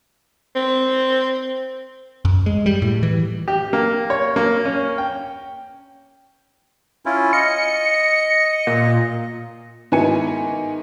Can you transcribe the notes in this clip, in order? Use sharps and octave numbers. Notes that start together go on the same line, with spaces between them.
C4
F#2
G#3
G3
A2
E3
G4
A#3
C#5
A#3
C#4
G5
C#4 E4 F4
D#5 C#7
A#2
G#2 D#3 B3 E4 G#5 C#7